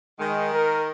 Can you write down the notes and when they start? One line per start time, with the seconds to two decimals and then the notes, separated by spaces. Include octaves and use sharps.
0.19 D#3 G#3
0.54 A#4